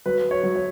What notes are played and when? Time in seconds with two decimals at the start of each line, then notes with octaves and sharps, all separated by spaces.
0.06 F#3 B4
0.31 C#5
0.43 F#3
0.56 C#5